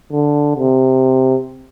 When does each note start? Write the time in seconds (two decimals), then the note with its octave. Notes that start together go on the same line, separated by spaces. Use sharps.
0.12 D3
0.56 C3